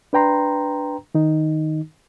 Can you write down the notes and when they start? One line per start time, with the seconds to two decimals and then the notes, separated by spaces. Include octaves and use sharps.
0.13 D4 B4 G5 A#5 C6
1.15 D#3 D#4